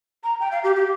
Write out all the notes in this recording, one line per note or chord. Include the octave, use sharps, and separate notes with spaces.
A#5
G5
F5
G4
G4